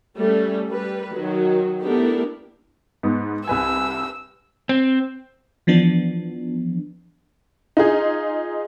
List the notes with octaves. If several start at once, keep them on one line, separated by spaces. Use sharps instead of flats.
G3 A3 C#4
G3 B4
D#3 F#3
A3 B3 D4 E4 G4 A#4
G#2 B3
C2 B4 G#5 E6
C4
E3 F3 B3 D4
D#4 F4 G#4